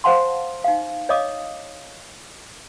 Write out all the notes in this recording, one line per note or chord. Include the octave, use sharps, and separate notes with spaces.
C5 F5 F#5 A5 C6
D#4 F5
C#5 D#5 F5 D6 D#6